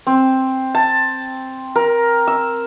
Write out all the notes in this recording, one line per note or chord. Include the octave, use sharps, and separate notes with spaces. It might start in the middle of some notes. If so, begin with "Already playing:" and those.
C4
A5
A#4
E6